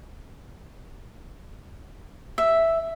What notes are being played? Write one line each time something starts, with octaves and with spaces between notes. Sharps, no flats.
E5